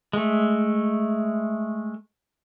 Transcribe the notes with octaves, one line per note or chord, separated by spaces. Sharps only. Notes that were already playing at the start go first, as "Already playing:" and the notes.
G#3 A3